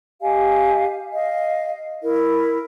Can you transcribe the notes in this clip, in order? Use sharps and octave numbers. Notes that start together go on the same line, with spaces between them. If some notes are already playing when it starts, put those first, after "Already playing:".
G4 D#5 F5 G#5
D#5 F5
E4 A#4